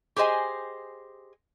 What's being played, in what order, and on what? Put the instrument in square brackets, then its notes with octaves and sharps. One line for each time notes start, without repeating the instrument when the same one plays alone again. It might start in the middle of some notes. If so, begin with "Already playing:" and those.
[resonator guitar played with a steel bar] G4 G#4 C5 D#5 G#5